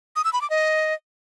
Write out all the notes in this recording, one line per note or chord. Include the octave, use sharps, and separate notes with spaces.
D#6
E6
B5
D6
D#5